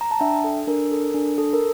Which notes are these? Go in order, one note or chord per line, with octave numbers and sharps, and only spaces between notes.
A#5
A5
D4 E5 G5
A4
D4 A#4
A4
D4
A4
A#4